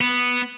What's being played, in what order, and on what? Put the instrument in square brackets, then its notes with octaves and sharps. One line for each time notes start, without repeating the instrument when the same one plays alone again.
[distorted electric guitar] B3